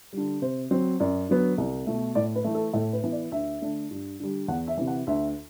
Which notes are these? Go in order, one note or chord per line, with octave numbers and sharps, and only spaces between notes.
D3 G3
C3 C5
F#3 C4
F#2 D5
D3 F#3 B3
C2
B2 A3
A2 D5
B4
E3 A3
A4
A2 A4
B4
E3 B3
D5
D2 E5
D3 A3 D4
G2
D3 G3
E2 F#5
E5
C3 E3
F#5
D2 E5